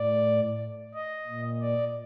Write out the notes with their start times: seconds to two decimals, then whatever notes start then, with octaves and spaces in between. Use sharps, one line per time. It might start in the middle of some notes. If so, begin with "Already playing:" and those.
Already playing: A2 D5
0.94 D#5
1.27 A#2
1.61 D5